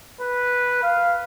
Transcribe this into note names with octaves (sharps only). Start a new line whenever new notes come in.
B4
F5